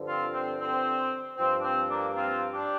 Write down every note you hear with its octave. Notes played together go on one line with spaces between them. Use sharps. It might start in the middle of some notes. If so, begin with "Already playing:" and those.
Already playing: G2 D3 F3
C4 F4
C4
C4
G2 F3 C4
D4
C4
A#3 D4
C4 F4
D4 G4